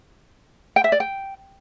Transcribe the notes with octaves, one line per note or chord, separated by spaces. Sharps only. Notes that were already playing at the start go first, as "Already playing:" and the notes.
G5
E5
D5
G5